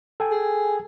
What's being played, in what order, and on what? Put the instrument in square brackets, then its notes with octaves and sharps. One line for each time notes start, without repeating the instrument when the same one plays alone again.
[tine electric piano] A4 G5 G#5
[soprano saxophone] G#4